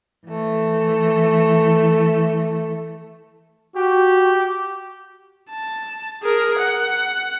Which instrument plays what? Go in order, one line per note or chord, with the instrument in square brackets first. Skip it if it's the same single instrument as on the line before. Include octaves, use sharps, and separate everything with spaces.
[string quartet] E3 A3
[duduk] F#4 [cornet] G4
[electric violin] A5
G#4 A#4
F#5